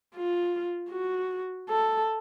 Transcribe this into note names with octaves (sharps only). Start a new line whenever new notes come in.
F4
F#4
A4